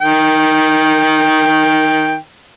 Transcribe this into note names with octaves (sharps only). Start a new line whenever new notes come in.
D#3 G5